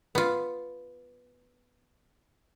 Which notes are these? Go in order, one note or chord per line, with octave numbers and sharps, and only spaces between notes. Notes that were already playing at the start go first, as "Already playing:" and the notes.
B3 F4